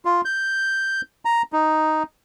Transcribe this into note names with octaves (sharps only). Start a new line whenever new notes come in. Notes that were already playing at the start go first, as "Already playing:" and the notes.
F4
G6
A#5
D#4